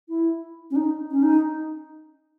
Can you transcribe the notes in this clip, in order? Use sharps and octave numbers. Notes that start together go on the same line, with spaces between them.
E4
C#4
D#4
C#4
D#4